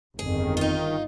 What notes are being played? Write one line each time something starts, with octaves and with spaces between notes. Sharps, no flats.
G1 F2 D#3 G#4
D#4 F4